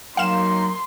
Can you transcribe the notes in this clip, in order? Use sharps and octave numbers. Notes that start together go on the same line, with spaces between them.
F#3 A#3 D#4 F5 C6 E7